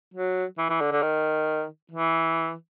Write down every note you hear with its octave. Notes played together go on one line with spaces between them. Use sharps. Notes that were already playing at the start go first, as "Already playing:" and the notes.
F#3
E3
E3
D3
D3
D#3
E3